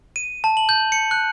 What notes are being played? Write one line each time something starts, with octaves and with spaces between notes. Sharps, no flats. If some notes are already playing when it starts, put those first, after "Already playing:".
D#7
A5
F#7
G6
C#7
F#6